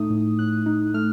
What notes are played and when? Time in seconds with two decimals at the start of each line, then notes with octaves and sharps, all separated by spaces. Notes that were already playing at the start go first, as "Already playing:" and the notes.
Already playing: A2 A3 D#4 D#6
0.10 A2
0.39 A2 F#6
0.66 D#4
0.94 A3 F6